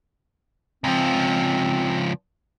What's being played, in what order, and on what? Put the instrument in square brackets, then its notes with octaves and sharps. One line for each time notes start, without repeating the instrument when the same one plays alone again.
[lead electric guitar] C#2 F3 [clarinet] C4